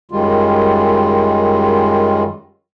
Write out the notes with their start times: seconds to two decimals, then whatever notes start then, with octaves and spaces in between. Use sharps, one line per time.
0.11 F#2 D#3 G3 G#3 F4